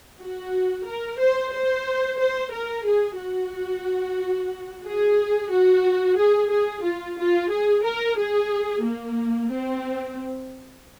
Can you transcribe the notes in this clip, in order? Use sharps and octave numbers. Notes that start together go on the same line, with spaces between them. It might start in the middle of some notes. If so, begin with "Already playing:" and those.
F#4
A#4
C5
C5
C5
A#4
G#4
F#4
G#4
F#4
G#4
G#4
F4
F4
G#4
A#4
G#4
A#3
C4